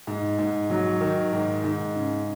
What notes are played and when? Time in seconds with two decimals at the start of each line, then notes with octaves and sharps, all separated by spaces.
0.07 G#2
0.39 G#2
0.70 F#3
1.01 D#3
1.33 G#2
1.64 G#2
1.96 C#3